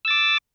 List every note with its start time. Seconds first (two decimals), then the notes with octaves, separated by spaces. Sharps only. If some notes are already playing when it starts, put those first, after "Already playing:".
0.05 E6
0.08 A6
0.10 D6